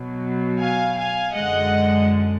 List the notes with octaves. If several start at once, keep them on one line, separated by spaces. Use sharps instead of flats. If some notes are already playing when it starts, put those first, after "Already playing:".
Already playing: B2 F#3
F5 G#5
F5 G#5
F#2 D3 G#3 D#5 F#5